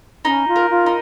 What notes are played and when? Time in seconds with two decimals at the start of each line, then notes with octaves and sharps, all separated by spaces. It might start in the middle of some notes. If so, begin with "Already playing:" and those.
0.25 C#4 D#4
0.48 F4
0.56 A#4
0.70 F4
0.86 D#4